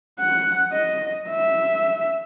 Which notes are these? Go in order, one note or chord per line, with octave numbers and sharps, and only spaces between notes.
F#5
D#5
E5